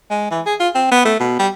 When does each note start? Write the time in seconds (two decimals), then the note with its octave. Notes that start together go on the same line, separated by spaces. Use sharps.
0.11 G#3
0.31 E3
0.46 G#4
0.60 F4
0.75 C4
0.91 B3
1.05 A3
1.20 B2
1.39 G3